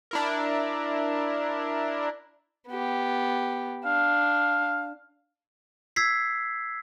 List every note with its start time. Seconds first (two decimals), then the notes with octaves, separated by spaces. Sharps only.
0.11 D4 E4 A#4
2.69 B3 G4
3.85 D4 F5
5.96 E6 G#6 B6 C7